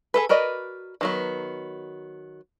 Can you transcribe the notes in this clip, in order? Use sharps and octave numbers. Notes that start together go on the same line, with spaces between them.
G#4 A4 B4
F#4 A#4 B4 D5 D#5
D#3 F#3 B3